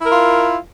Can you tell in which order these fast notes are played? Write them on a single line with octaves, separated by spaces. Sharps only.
E4 A#4 F4